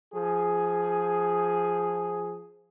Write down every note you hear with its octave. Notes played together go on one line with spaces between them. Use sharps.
F3 G#4